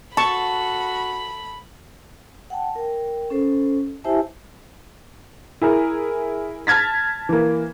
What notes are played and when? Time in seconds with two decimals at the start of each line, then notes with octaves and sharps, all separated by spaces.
0.17 F#4 A4 A5 B5 C#6
2.50 F#5 G5 A5
2.76 A#4 G5
3.30 C#4 A4 C5
4.04 E4 G4 C5 E5 G#5 A5
5.62 E4 G#4 A#4
6.67 A5 F6 G#6 A6 B6
7.29 E3 A#3